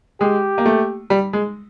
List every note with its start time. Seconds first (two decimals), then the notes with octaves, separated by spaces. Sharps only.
0.21 G#3 G4
0.58 A#3
0.66 A3
1.10 G3
1.33 G#3